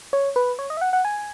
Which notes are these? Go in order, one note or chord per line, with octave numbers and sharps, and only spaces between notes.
C#5
B4
C#5
D#5
E5
F#5
F#5
G#5